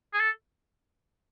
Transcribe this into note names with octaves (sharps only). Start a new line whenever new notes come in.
G#4
A4